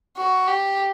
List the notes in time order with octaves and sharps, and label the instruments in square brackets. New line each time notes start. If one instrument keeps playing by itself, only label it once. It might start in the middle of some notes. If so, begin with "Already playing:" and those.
[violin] F#4
G4